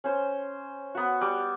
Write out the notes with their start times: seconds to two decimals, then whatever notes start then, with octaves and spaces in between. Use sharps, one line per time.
0.04 C#4 C5
0.95 B3 F#4
1.21 G3 D6